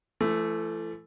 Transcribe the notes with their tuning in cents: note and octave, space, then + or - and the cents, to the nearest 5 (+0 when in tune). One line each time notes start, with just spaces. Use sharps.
E3 +40 A3 +0